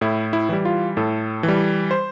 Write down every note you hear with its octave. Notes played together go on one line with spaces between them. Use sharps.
A2 E4
E4
E3 G3
F4
A2 A4
E3
G3
C5